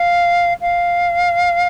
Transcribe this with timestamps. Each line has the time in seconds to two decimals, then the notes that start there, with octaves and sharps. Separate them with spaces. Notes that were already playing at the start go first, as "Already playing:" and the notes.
Already playing: F5
0.61 F5